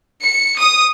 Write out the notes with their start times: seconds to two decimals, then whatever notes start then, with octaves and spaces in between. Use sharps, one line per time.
0.21 C#7
0.57 D#6